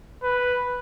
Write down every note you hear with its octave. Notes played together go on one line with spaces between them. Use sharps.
B4